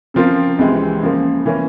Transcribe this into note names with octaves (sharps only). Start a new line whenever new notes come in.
C#3 F3 C4 F4 A#4
C#2 C3 E3 G#3 C4
C#3 F3 A#3
E3 A#3 C#4